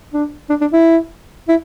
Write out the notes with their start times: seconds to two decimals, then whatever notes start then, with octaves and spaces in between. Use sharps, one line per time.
0.13 D4
0.49 D4
0.61 D4
0.73 E4
1.48 E4